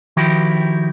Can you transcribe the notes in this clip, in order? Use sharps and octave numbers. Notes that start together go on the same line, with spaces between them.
D#3 F3 E4 F#4 G4